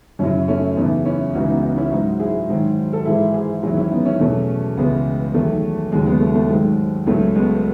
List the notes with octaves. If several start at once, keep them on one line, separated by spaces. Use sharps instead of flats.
F#2 C#3 F#3 C#4 E4
A3 C#4
E2 C#3 E3 B3 D#4
C#4 E4
C#2 C#3 E3 D#4 F#4
B3 D#4
B3 D#4
C#4 E4
G#2 F#3 D#4 F#4
E4 G#4
G#2 D#3 F#3
A4
G#2 E3 E4 G#4
E4 G#4
E2 D#3 F#3 E4 G#4
C#4 E4
B3 D#4
C#4 E4
E2 B2 F#3 A3 C#4
C#2 C#3 E3 G#3 B3
E2 D#3 F#3 A3
D#2 C#3 F#3 G#3
G#3 B3
A3
A3
G#2 D#3 F#3 G#3
C#2 C#3 F#3 A3
G#3 B3